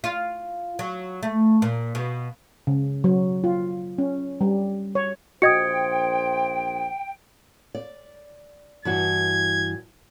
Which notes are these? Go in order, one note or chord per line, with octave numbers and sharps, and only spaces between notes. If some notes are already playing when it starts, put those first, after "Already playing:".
F4
F#3
A3
A#2
B2
C#3
F#3
F4
C#4
G3
C#5
A#1 F#4 C5 D#5 G5 D#6 G#6 C#7
D5
G2 E3 F#4 G#6